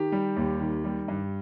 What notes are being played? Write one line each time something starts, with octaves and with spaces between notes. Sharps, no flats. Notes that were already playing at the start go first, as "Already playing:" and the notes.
Already playing: D#3 G4
G3
D#2
D#3
G3
G2